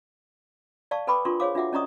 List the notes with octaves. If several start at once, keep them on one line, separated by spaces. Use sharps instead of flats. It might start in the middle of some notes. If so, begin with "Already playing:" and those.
D5 F5 A5 C#6
A4 B4 G5 B5 C#6 D6
D4 F4 A4 A#4 C6 C#6
G#4 C5 C#5 F5 D6
D4 F4 F#4 E5 F#5 D6
C#4 D5 D#5 A#5 C#6 D#6